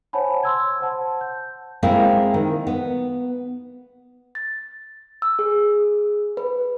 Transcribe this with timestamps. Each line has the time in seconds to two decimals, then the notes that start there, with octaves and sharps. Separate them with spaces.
0.13 C5 C#5 F#5 G#5 A5 B5
0.43 C6 E6 G#6
0.80 C5 F#5 A5
1.21 G6
1.83 G#3 A#3 C4 E4 F5
2.34 D#3
2.67 B3
4.35 A6
5.22 E6
5.39 G#4
6.37 B4